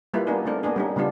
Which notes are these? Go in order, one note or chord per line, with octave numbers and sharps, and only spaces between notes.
G3 A#3 E4 F4 B4
A#3 B3 D4 D#4 G#4
A3 C4 D4 A#4
A#3 B3 D4 G#4
G3 C#4 D#4
C#3 G3 B3 D4 F4